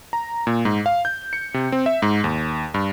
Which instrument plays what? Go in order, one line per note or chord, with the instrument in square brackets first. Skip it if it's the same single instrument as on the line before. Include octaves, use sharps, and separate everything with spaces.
[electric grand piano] A#5
A#2
G#2
F5
G6
C#7
C3
C4
E5
G#2
D#2
G2